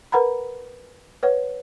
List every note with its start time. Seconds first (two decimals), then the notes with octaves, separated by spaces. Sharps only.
0.12 A#4 B4 F#5 A#5 B5
1.23 B4 C#5 F#5